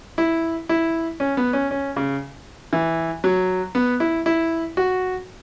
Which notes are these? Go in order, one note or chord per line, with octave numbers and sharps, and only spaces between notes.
E4
E4
C#4
B3
C#4
C#4
C#3
E3
F#3
B3
E4
E4
F#4